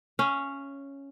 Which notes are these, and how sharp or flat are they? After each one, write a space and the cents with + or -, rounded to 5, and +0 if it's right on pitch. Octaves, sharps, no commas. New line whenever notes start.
C#4 +0 F5 -40